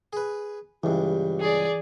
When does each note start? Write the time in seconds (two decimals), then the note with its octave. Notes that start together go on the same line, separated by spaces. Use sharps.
0.13 G#4 B4
0.84 C#2 G2 E3 G4
1.40 G#4 D5